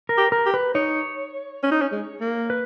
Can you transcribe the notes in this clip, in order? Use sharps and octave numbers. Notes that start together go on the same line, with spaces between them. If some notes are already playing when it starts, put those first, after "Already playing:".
A#4
G4
A#4
G4
B4
D#4 C#5
C#4
D#4
C#4
G#3
A#3
B4